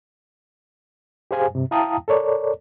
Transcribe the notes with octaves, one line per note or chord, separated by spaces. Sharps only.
G4 G#4 C5 F5 G#5
G2 C3
E4 F5 G5 A5 A#5 D#6
A4 A#4 C#5 D5